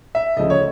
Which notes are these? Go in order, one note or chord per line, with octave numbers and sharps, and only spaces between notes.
E5
D2 C#3 F3 D#5
C#5